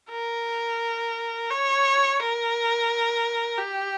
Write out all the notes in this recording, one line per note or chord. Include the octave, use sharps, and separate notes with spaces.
A#4
C#5
A#4
G4